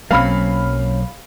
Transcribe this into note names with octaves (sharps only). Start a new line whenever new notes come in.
B1 F#3 A#3 C4 C#4 F5 B5 F6